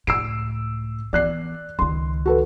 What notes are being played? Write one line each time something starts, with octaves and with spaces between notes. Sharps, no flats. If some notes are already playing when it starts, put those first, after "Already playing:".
C#2 A2 E6 C7 D7
E3 B3 D5 F#6 C7
C#2 D#3 C6
F#4 A4 B4